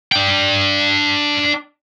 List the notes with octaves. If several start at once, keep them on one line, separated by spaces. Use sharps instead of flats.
D4 G5